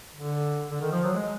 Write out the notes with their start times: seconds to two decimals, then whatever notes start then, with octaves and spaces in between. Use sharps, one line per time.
0.15 D3
0.71 D3
0.81 D#3
0.92 F3
1.04 F#3
1.14 G#3